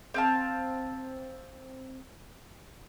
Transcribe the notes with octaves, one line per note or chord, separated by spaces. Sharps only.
C4 F5 A5